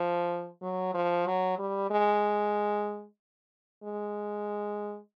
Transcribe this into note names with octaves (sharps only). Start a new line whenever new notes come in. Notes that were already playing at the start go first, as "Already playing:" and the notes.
Already playing: F3
F#3
F3
F#3
G3
G#3
G#3